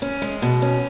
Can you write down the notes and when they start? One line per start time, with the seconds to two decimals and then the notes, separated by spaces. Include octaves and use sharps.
0.02 C#4
0.22 G#3
0.42 B2
0.62 C#4